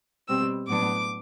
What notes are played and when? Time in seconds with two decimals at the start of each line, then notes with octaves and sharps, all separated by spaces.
0.28 B2 G3 C4 E6
0.68 A2 F#3 B3 D4 D6